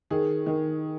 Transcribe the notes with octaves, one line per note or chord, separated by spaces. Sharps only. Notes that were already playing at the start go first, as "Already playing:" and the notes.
D#3 G#4
D#3